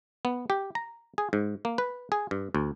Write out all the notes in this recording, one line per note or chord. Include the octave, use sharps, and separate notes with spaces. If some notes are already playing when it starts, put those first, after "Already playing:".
B3
G4
A#5
G#4
G#2
A#3
B4
G#4
G2
D2